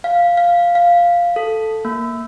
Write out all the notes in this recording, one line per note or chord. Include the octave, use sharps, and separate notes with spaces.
F5
F5
F5
A4
A#3